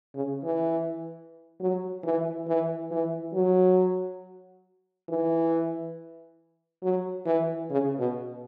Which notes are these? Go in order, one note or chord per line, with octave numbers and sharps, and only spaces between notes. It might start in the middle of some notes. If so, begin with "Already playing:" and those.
C#3
E3
F#3
E3
E3
E3
F#3
E3
F#3
E3
C#3
B2